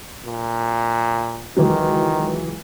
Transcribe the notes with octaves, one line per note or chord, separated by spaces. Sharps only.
A#2
C#2 D#3 E3 F#3